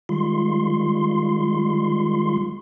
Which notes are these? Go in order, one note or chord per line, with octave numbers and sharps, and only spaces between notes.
D#3 G3 G#3 F4 C6